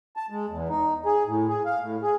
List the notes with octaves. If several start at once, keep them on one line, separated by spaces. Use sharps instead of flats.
A5
G#3
E2
D#4
G#4
A2
G#4
F5
A2
G#4